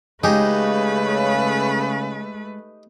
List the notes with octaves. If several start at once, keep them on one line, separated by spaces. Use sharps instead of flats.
C#3 G#3 A3 D#4 G4 B4